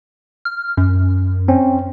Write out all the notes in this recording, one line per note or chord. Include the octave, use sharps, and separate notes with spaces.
F6
F#2
C4 C#4